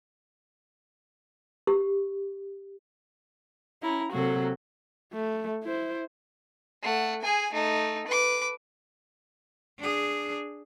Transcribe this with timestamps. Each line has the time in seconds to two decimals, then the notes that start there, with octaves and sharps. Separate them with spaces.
1.67 G4
3.82 C#4 E4 A#5
4.12 C3 F#3 A#3 F#4 A4
5.13 A3
5.63 E4 C5
6.82 A3 F#5
7.22 G#4 G#5
7.53 A3 D#4
8.07 B4 D6
9.80 D4 G#4